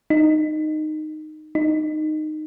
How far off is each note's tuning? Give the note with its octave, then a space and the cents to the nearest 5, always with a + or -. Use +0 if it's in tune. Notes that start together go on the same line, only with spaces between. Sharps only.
D#4 -15
D#4 -15